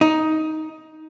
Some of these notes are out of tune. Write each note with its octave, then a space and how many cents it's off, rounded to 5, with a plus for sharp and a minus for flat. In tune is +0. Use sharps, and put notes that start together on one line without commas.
D#4 +10